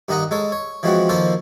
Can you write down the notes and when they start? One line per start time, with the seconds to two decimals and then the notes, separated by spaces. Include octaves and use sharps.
0.08 G2 D#3 D#4 D#5 F#5 A#5
0.31 G#3 A4 C#5
0.52 C#5
0.83 E3 F3 G#3 C4 C#4 F#4
1.09 D#3 F3 A#3 A4 C5 C#5